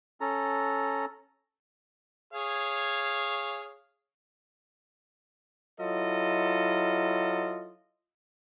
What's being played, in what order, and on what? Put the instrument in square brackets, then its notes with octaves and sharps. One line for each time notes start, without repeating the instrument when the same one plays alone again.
[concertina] C#4 A4 A#5
[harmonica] G#4 C#5 F5
[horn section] F#3 E4 F4 A4 D#5